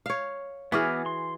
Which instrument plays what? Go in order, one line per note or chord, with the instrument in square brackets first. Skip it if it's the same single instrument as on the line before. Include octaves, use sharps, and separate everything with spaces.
[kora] C#5 F5
[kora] E3 F#4 G#4 [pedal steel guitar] B3 D6 F6
[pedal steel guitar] C6